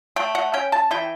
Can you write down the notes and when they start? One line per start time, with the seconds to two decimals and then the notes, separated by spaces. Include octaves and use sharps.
0.16 A3 G5
0.35 F#5
0.53 C#4 G5
0.72 A5
0.91 E3 G5